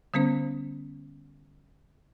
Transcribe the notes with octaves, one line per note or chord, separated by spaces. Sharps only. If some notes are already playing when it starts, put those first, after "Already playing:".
D3 G3 B3 C#4 C5